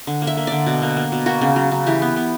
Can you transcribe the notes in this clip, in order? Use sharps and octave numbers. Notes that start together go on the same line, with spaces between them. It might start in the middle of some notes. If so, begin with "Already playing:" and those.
D3
A#3
E5
A#3
D3 D5
B2
A#3
A#3
B2
A#3 F#4
C#3
F#3
C#3
E3 G4
B3
B3